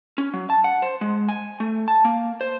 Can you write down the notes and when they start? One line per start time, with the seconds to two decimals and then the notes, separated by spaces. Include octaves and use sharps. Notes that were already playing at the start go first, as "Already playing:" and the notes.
0.18 C#4
0.34 F#3
0.50 A5
0.64 F#5
0.82 C5
1.01 G#3
1.29 G#5
1.60 A3
1.88 A5
2.05 A#3
2.41 C5